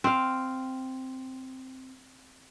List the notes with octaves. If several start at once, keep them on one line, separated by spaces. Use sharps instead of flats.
C4 F5